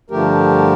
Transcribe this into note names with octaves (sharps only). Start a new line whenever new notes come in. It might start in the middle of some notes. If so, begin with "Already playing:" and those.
G2 D3 F3 A3 G4 A#4